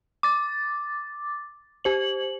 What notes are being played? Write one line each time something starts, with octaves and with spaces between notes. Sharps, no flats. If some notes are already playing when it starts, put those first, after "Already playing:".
D6 A6
G4 C5 F#7